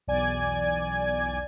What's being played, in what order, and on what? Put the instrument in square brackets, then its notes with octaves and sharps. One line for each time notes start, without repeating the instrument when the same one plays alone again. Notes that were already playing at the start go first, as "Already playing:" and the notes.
[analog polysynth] B1 E2 D5 G#5 G#6